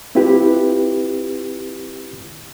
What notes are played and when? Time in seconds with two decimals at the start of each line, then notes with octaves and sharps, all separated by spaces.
0.15 C4 E4 F4 G4 B4